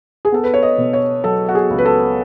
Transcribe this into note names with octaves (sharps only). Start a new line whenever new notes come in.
G#4
B3 A4
B4
C#5
D#5
B2
C#5
F#3 A4
F#4
G#4
C#2
B4
A4